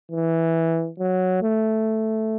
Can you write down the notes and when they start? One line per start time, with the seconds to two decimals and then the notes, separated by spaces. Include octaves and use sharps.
0.12 E3
0.99 F#3
1.43 A3